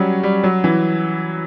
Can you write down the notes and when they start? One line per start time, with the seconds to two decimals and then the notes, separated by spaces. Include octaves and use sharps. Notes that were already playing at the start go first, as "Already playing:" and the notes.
Already playing: F#3 G3 C#4
0.23 G3
0.44 F#3
0.64 E3